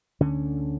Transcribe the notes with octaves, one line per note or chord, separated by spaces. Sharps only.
D2 D3 C#4